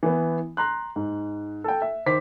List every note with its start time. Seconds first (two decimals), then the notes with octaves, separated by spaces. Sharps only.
0.03 E3 B3
0.57 A#5 C6 F#6
0.96 G#2
1.64 A4 G5
1.82 E5
2.06 D#3 C5 D6 B6